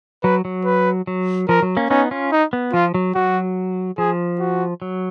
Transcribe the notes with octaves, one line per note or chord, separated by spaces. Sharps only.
F#3 B4
F#3
B4
F#3
F3 A#4
F#3
A#3 C#4
B3 C#4 D#4
C#4 F4
D#4
B3
F3 F4
F#3
F#3 F#4
F3 G#4
F#4
F#3